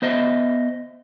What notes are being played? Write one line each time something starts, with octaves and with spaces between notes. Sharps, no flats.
B3 C5 D#5 E5